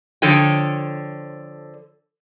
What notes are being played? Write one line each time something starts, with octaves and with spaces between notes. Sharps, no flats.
D3 F3 A4 C#5 G5